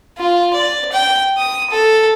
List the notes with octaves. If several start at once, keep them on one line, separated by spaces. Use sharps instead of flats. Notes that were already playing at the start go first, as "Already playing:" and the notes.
F4
D5
G5
D#6
A4